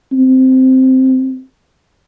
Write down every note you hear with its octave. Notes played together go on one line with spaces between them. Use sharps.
C4